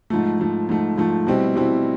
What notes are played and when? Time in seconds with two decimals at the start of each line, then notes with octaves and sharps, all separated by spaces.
0.10 G#2 F3 A3
0.40 G#2 F3 A3
0.69 G#2 F3 A3
0.98 G#2 F3 A3
1.27 B2 G3 C4 E4
1.56 B2 G3 C4 E4